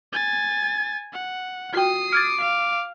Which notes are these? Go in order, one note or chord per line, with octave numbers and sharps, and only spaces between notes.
G#5 A6
F#5
F4 F#4 G5 D#6 C7
D6 F6 G#6 A6
F5